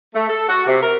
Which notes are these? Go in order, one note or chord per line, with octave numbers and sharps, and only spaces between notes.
A3
A4
F#4
C3
A#4